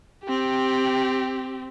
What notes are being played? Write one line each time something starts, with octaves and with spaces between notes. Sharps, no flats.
C4 G4